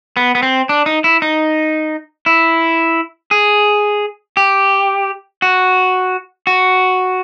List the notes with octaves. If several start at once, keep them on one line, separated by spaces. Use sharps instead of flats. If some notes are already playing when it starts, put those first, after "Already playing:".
B3
B3
C4
D4
D#4
E4
D#4
E4
G#4
G4
F#4
F#4